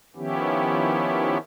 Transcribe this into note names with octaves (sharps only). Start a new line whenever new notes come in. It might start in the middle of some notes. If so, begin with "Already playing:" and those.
D#3 F3 B3 C#4 E4 G4